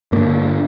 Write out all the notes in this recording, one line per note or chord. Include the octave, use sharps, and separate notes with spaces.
G2 D3 A#3